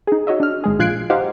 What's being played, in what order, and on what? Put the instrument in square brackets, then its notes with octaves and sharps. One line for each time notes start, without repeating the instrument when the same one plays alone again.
[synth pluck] D#4 G#4
F#4 C#5 D#5 E5
D4 F6
G#1 G#3 G#4
A#1 F4 F#6 G#6 C7 D7
D#4 G4 C5 D#5 F5 F#5